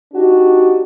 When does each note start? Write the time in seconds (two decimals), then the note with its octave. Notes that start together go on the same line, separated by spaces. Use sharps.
0.13 D4 D#4 F#4 G4